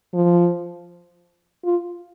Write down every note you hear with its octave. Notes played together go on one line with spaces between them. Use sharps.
F3
F4